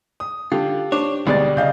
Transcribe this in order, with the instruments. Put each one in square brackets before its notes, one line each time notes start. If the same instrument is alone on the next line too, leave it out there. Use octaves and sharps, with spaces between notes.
[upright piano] D#6
[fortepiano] D3 [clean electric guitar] F4 [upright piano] G4
[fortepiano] D4 [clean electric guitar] C5 C#5
[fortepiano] D2 B2 [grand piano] G3 D5 A6 [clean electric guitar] G#3 D#4 G#4
[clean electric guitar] C#3 [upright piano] D#5 F5 G6